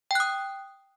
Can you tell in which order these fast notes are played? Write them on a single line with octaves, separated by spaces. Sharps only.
G5 F#6 D#6